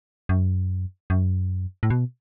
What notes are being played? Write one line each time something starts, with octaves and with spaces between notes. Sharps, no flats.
F#2
F#2
A2
B2